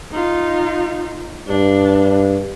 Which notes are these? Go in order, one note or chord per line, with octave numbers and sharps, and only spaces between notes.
D#4 F4
G2 D4